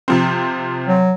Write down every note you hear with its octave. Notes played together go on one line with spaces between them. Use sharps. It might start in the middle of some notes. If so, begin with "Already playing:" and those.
C3 F3 C4
F#3